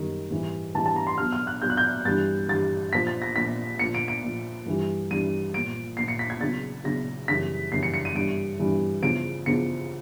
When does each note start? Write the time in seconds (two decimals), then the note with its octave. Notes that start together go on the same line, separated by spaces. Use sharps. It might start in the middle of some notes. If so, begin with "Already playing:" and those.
Already playing: F#2 D#3 G3
0.31 G#2 E3 G3
0.75 G#2 E3 G3 A5
0.86 A5
0.96 A#5
1.07 C6
1.18 B2 F#3 F6
1.33 F6
1.47 F#6
1.62 B2 F#3 G6
1.70 F#6
1.77 G6
2.05 G2 E3 G3 A6
2.48 G2 E3 G3 A6
2.93 A#2 F3 B6
3.07 A6
3.22 A#6
3.36 A#2 F3 B6
3.79 A#2 F3 C#7
3.94 D7
4.08 D7
4.23 A#2 F3
4.66 G2 E3 G3
5.11 G2 E3 G3 D#7
5.53 A#2 F3 D7
5.97 A#2 F3 C7
6.08 C#7
6.19 B6
6.30 G#6
6.40 E2 C#3 F#3 A6
6.84 E2 C#3 F#3 A#6
7.28 F#2 C#3 E3 G3 B6
7.72 F#2 C#3 E3 G3 C7
7.83 C#7
7.94 C#7
8.05 D#7
8.15 G2 E3 G3 D7
8.60 G2 E3 G3
9.02 E2 C#3 F3 D7
9.46 E2 C#3 F3 C#7